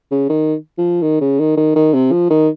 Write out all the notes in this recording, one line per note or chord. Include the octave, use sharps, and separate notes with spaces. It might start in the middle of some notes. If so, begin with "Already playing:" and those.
C#3
D#3
F3
D#3
C#3
D#3
D#3
D#3
C3
F3
D#3